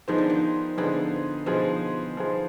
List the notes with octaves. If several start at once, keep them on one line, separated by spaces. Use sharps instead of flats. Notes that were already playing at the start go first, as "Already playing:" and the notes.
D#3 F3 B3 D#4 G#4 C5
D3
D#3
D3 F3 B3 D#4 G#4 C5
B2 F3 B3 D#4 G#4 C5
F3 B3 D#4 G#4 C5